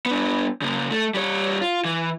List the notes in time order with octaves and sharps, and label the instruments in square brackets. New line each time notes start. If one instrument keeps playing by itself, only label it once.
[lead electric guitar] B3 D4
C#3 A#3
A3
G3 C#5
F4
E3